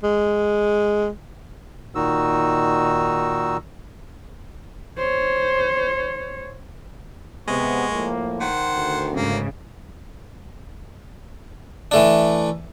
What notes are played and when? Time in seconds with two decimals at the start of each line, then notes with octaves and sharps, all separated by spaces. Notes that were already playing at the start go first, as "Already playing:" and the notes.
0.03 G#3
1.95 A#2 D#3 D#4 F#4 E6
4.98 C5 C#5
7.48 C3 G#3 B3 C#6
7.91 A2 F3 A#3
8.40 D#3 C5 F#5
8.74 D2
9.15 G#2 C#3 A#3
11.91 E3 A3 D4